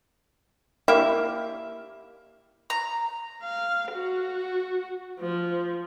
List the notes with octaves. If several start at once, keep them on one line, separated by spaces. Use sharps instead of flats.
A#3 E4 G4 E5
A#5
F5
F#4
F3